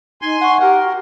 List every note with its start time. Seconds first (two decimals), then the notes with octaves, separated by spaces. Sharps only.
0.22 D#4 G#5 C6
0.41 F#5 C#6
0.61 G4 A#4 F#5
0.86 F#4